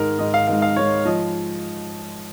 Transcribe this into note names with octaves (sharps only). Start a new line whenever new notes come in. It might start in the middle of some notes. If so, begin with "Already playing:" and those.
Already playing: G#2 D#3 G#3 A#4
G#2 D#3 G#3 D#5
F5
G#2 D#3 G#3 F5
F5
G#2 D#3 G#3 C#5
F3 G#3 D#5